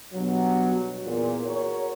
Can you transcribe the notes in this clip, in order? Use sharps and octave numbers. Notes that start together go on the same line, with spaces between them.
B1 G2 B2 F#3
E2 A#2
F#4 G#4 A#4 C#5